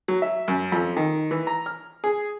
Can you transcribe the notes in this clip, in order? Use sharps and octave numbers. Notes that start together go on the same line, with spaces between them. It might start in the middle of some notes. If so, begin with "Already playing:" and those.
F#3
E5
F#2
F2
D#3
E3
A#5
F6
G#4